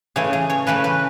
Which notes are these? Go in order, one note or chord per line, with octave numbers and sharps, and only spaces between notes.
C#3 E3 A3 G#4
G#4
C#5
C#3 E3 A3 B4
B4